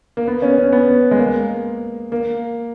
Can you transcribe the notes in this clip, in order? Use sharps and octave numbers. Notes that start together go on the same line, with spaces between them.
A#3
B3
C#4
C#4
B3
G#3
A#3
A#3